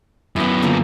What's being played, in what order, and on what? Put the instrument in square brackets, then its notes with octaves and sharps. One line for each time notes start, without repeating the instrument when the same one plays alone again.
[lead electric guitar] F#2 B3 [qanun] E4 G5
[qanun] D3 F3 A#3